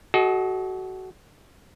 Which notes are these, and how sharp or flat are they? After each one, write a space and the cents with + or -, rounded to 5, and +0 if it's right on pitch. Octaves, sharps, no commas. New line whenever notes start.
F#4 +20 A4 -45 D#5 +15